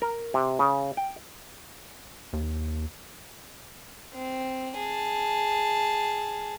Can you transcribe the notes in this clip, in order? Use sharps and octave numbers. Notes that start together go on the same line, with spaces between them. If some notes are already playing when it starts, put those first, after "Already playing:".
A#4
C3
C#3
G5
D#2
C4
G#4 A5